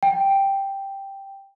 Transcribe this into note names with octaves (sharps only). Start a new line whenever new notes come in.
G5